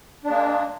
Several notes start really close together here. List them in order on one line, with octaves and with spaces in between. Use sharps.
D4 G#3 A#3